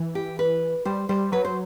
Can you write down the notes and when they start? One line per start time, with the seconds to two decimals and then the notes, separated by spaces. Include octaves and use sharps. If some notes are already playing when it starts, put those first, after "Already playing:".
Already playing: E3
0.15 G4
0.39 B4
0.85 G3 C5
1.09 G3 C5
1.32 F#3 B4
1.45 C5